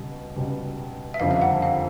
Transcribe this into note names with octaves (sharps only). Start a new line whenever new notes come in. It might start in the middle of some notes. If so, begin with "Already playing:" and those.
Already playing: C#2 B2 G3
C#2 B2 G3
E5
F#1 F2 D3 G3 F5
F5
F#5
F5